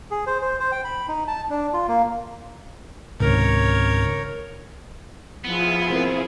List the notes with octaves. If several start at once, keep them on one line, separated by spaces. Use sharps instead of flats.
G#4
C5
C5
C5
G5
B5
D#4
A5
D4
F4
A#3
C#2 G#2 C3 D#3 A#4 C#5
F3 B3 E4 F4 G#4
C4 A#4 B4